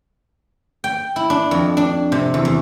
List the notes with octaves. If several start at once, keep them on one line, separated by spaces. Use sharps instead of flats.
G5
E4
D4
F2
D4
C3
E2
E2